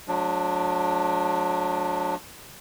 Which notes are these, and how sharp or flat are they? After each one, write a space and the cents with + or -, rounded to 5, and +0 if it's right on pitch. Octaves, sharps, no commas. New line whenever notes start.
F#3 -35 A3 -40 D4 +0